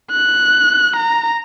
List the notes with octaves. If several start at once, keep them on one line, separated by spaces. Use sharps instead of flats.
F#6
A#5